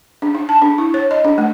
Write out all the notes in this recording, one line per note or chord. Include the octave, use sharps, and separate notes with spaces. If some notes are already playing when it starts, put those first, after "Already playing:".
D4
D#4
A5
D4
E4
C#5
D#5
D4
A3